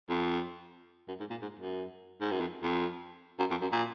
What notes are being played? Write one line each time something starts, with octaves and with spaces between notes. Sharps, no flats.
F2
F#2
G#2
A#2
G#2
F#2
G#2
F#2
F2
F2
F#2
F2
F#2
A#2